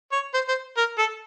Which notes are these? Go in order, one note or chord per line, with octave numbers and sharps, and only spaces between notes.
C#5
C5
C5
A#4
A4